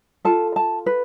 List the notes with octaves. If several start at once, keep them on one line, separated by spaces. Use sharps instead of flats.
F4 A4 A5
A5
B4